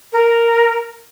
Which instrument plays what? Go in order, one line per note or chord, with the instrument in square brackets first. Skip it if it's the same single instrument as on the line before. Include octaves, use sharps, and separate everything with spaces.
[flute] A#4